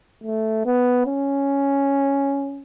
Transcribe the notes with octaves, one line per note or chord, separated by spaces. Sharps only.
A3
B3
C#4